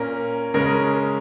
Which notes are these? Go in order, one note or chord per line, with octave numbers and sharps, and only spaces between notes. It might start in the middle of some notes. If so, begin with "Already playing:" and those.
Already playing: A#2 A#3 C#4 A#4
C#3 G#3 C#4 A#4